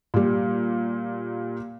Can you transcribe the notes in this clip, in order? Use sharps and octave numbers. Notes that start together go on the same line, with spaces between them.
A#2 G3